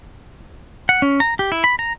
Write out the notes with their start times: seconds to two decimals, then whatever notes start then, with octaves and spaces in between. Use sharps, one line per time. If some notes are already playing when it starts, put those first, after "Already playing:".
0.89 F#5
1.02 C#4
1.20 A#5
1.39 G4
1.52 E4
1.64 B5
1.79 A#5